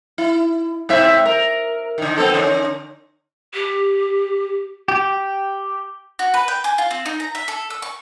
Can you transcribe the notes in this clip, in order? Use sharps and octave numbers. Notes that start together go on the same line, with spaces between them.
E4
G#2 C4 E5
A#4
D3 D#3
B3 C4 A4
D3 C#4 A#4
G4
G4
F#4
B4
G5
G#5
F4
C4
D#4
A#5
E5
A4
E6
C#6